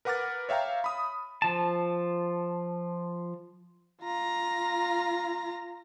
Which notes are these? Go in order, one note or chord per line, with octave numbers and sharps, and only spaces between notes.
A#4 B4 F#5 D6 F6 A6
C#5 E5 F5 G5 A#5
B5 D#6
F3 A5
F4 A#5